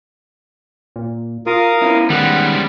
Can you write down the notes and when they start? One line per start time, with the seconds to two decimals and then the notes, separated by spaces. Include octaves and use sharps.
0.96 A#2
1.47 F4 A#4 F5 D#6
1.82 B3 C#4 E4
2.10 D#3 G3 G#3 F#5